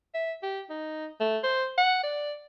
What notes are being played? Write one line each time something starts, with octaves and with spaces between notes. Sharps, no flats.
E5
G4
D#4
A3
C5
F#5
D5